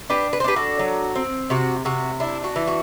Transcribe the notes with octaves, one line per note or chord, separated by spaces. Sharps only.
D4 G4 B4
B4
C5
D4 G4 B4
F#4 A4
F#3
C4
C3 F#4
C3 F#4
D4 E4
F#4
E3
F#4